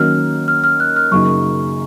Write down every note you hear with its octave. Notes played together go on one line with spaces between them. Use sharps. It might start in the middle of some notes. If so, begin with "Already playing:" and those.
Already playing: D#3 F#3 A#3 C#4 F6
F6
F6
F#6
F6
F#2 C#3 F#3 A#3 D#4 C#6